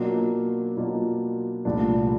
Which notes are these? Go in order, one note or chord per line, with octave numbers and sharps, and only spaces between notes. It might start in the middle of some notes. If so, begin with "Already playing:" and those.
Already playing: B2 F#3 A#3 D4 F4
B2 F#3 A#3 D4 F4
C2 A#2 F3 A3 D4